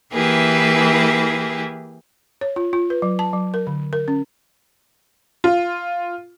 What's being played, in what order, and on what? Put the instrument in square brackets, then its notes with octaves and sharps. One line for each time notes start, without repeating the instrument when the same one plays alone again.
[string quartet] E3 A#3 E4 G4 G#4 B4
[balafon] C#5
F4
F4
B4
F#3
A5
F#3
A#4
D3
A#4
C#4
[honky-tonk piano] F4